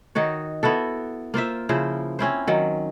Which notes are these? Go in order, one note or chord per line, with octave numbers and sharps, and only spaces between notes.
D#3 D#4 F#4 C#5
B3 E4 F#4 A4
A#3 F4 C5 E5
C#3 F3 E4 C5
C4 C#4 E4 C5
D#3 F#3